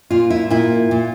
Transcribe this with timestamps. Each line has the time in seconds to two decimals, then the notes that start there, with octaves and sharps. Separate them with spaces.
0.10 A#2 F4
0.30 E4
0.50 A#2 E4
0.91 A#2